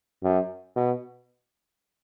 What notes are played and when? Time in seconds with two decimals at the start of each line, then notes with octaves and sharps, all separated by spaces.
0.23 F#2
0.76 B2